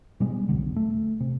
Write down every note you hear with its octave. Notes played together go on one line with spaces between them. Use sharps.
B2 G3 G#3
E1 B1 D3
A3
C3